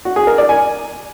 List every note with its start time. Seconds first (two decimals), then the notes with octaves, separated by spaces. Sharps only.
0.05 F#4
0.16 G#4
0.27 A#4
0.38 D5
0.49 G#5